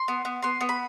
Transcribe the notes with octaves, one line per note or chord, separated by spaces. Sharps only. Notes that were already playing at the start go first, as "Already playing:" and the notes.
Already playing: C6
B3
B3
B3 C6
B3
B5